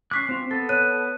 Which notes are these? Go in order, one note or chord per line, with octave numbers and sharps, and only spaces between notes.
C#4 C#6 D6 F#6 B6 C7
C4 F4
B3 A4 A6
C#5 F#6 D#7